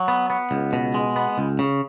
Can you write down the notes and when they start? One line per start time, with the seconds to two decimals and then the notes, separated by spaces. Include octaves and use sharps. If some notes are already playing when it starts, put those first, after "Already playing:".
Already playing: F#3
0.08 B3
0.30 B3
0.51 C#2
0.73 B2
0.94 G#3
1.16 B3
1.38 C#2
1.59 C#3